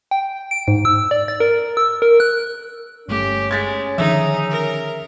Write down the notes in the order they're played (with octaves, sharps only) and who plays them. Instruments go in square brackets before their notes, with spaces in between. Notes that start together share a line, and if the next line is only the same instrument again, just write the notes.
[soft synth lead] G5
D7
G#2
E6
D5
A6
A#4
E6
A#4
F#6
[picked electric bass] G1 A3 [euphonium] C#4 [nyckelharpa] G4
[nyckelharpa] G#3 [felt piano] G#6 A6 B6
[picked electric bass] D3 D#3 F3 [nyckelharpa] D#4 [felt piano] G#4 E5
[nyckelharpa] A#4